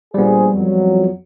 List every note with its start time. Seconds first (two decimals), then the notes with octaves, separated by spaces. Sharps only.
0.14 A#1 G3 B3 G#4 C5
0.53 F2 F#3